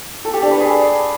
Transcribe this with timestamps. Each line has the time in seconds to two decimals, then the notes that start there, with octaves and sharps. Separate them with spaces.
0.25 A4
0.33 G4
0.42 D4
0.51 B4
0.60 G#4